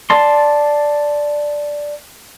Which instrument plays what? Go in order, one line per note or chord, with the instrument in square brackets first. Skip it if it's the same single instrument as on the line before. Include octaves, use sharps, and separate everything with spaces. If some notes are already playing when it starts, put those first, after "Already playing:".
[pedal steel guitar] D5 A5 C6